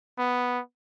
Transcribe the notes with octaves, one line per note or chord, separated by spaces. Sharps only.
B3